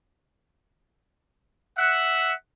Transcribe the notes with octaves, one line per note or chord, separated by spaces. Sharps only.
E5 F#5